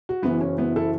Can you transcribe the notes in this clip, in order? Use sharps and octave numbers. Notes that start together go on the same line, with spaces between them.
F#4
F#1 F#2 E3 B3 E4
C#4
B3 E4
E4 A4